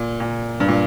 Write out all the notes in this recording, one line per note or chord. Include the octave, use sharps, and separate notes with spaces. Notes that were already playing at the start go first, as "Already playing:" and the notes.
Already playing: A#2
A#2
G2
A#2